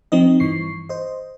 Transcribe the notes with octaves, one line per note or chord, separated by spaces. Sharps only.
F3 C4 D#4 D#5
G2 E3 C#6 C7
C5 D#5